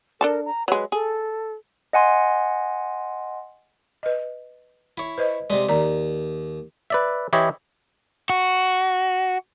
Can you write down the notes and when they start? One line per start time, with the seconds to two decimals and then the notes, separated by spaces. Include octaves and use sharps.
0.21 D4 A4 A#4 A5
0.45 A#5
0.68 F#3 G#3 B4
0.92 G#4 A4
1.93 D#5 F#5 G#5 C6
4.03 B4 D#5
4.98 E4 C#5
5.18 B4 C5 D#5
5.50 C3 G#3 D5
5.69 D#2 D5 A#5
6.90 B4 D5 E5
7.33 E3 E4 G4 C#5 D#5 E5
8.30 F#4